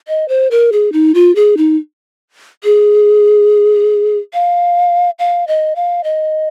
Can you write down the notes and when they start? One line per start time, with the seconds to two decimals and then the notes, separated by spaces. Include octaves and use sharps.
0.08 D#5
0.29 C5
0.51 A#4
0.72 G#4
0.93 D#4
1.15 F4
1.36 G#4
1.57 D#4
2.64 G#4
4.34 F5
5.19 F5
5.48 D#5
5.76 F5
6.04 D#5